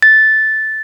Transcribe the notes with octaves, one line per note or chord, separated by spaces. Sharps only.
A6